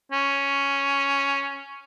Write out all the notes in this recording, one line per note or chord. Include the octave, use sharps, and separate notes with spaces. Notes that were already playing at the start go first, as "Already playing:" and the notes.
C#4